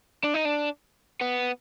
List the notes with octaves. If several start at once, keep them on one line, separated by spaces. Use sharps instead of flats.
D4
D#4
D4
B3